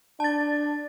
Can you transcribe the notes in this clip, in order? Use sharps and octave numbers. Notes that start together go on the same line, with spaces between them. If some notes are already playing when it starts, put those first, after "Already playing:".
D4 A5 A6